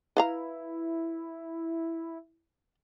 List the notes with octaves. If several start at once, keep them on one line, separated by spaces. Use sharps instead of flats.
E4 B4 F5 A#5